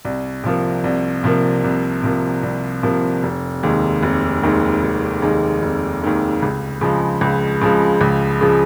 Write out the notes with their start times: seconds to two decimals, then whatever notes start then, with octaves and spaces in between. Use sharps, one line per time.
0.05 C2
0.44 C3 F3 A#3
0.84 C2
1.24 C3 F3 A#3
1.64 C2
2.03 C3 F3 A#3
2.43 C2
2.83 C3 F3 A#3
3.23 F1
3.63 D#2 D#3 G#3
4.03 F1
4.43 D#2 D#3 G#3
4.83 F1
5.22 D#2 D#3 G#3
5.62 F1
6.02 D#2 D#3 G#3
6.42 C#2
6.81 C#3 F3 G#3
7.21 C#2
7.62 C#3 F3 G#3
8.01 C#2
8.41 C#3 F3 G#3